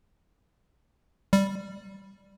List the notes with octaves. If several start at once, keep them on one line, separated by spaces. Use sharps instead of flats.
G3